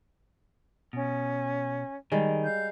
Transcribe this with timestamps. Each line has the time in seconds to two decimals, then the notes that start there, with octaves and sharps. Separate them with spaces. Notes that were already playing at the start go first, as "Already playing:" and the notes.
0.93 B2 C#4
2.12 D#3 G3 G#3
2.43 F5 G6